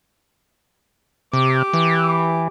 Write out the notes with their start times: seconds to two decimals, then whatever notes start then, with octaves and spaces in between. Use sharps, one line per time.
1.33 C3 G4 D6
1.73 E3